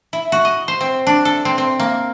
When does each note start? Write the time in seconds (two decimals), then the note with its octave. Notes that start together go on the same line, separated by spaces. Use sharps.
0.13 E4
0.32 F#4
0.45 D#5
0.68 C5
0.81 C4
1.07 D4
1.25 A4
1.45 C4
1.58 C4
1.79 A#3